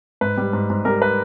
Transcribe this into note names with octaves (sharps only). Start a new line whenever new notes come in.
G#2 B4
G3
G#2
G#2
G3 A#4
B4